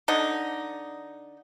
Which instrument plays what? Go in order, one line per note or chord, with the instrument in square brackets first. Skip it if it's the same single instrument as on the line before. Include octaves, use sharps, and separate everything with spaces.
[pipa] D3 D#4